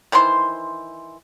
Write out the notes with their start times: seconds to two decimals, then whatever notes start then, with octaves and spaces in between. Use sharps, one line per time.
0.12 D#3 E3 C5 C6